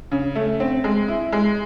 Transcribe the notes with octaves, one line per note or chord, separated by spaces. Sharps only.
C#3
A3
C4
G#3
E4
G#3